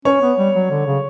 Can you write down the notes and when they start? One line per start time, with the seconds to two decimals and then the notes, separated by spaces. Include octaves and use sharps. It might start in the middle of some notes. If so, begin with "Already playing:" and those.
0.05 C#4 C#5
0.21 B3
0.38 G3
0.55 F#3
0.70 D3
0.87 C#3